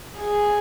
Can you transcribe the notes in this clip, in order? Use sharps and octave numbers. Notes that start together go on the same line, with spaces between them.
G#4